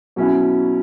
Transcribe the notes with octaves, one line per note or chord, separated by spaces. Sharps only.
B2 F#3 C#4 E4